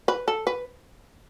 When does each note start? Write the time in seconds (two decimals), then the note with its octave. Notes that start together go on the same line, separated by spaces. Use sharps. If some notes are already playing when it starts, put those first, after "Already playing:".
0.08 B4
0.28 A4
0.47 B4